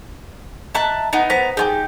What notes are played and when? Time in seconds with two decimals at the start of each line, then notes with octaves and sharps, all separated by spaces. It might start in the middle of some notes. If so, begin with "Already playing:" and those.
0.75 D#5 E5 A5 A#5 F#6
1.13 B3 D#4
1.30 B3 C5 A#5 B6
1.57 D#4 F4 G4 G#4 G#5